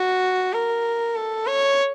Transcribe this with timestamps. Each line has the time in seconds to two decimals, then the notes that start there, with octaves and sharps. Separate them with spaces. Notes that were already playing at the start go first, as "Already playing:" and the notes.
Already playing: F#4
0.53 A#4
1.16 A4
1.47 C#5